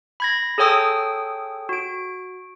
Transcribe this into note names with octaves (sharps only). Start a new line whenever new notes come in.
B5 G#6 A#6
G#4 A4 C#5 G5 D#6 E6
F#4 D7